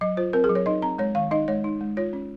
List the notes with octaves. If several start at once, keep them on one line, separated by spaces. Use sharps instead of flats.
F#3 D#5
F4 C5
C4 A#4
G#4
F#3
C#5
D#4 D#5
C4 A#5
G#3 C#5
D#3 F5
D#4 D#5
G#3 C#5
D#4
G#3
F4 C#5
C#4